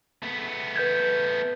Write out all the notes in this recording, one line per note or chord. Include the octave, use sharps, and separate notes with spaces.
A3 B3
B4 G6 G#6